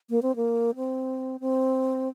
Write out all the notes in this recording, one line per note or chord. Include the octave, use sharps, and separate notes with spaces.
A#3
C4
A#3
C4
C4